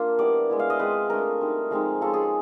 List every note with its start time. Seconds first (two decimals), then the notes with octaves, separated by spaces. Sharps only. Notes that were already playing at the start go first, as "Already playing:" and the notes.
Already playing: A#3 D4 F4
0.19 G3 B3 E4 D5
0.50 G#3 B3 E4
0.59 F5
0.70 D#5
0.79 G#3 C4 F4 B4
1.10 A3 D4 F4 A#4
1.41 G3 C4 D#4
1.71 F3 G#3 C4 D#4
2.01 G#3 C#4 F4 A4
2.13 G#4